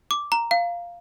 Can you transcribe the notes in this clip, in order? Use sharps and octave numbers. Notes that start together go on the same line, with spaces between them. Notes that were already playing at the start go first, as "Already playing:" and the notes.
D6
A#5
F5